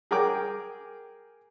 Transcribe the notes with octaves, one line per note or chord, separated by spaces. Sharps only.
G#4 A#4 G5 D6